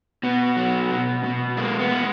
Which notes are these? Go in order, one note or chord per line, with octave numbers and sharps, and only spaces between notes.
B2 B3
F#3
B2
B2
G#3 A#3
B3
G#3